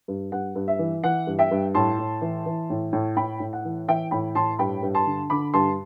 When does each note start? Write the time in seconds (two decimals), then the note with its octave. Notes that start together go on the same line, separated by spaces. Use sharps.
0.08 G2
0.32 G2 F#5
0.55 G2
0.68 E5
0.79 E3
1.04 E3 F#5
1.27 G2
1.39 E5 G5
1.51 G2
1.74 A2 A5 C6
1.99 A2
2.22 E3
2.46 E3
2.70 A2
2.93 A2
3.17 A2 G5 B5
3.40 A2
3.53 F#5
3.65 E3
3.88 E3 E5 G5
4.11 A2 G5 B5
4.35 A2 A5 C6
4.59 G2 G5 B5
4.83 G2
4.95 A5 C6
5.06 D3
5.30 D3 B5 D6
5.54 G2 A5 C6